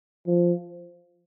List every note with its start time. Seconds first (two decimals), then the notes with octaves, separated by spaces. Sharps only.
0.27 F3